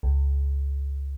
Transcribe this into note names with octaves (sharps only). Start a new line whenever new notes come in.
C#2